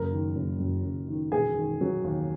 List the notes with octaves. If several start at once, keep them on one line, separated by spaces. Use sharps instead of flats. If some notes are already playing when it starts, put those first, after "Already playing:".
Already playing: F#1 A#4
D#3
F#1
F#2
F#1
D#3
E1 G#4
D#3
F#3
D#2